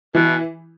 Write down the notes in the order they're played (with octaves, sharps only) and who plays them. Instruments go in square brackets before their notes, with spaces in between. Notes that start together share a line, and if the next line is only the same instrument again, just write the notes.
[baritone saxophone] B2 [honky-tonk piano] E3